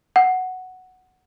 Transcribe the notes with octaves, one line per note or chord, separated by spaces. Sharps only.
F#5